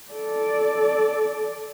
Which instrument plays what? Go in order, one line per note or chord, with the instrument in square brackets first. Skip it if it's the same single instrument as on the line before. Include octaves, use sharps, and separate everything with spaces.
[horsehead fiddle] A4 D5